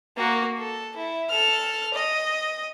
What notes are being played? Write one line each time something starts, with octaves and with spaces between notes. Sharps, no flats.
A#3 F#4
A4
E4
A4 F6
D#5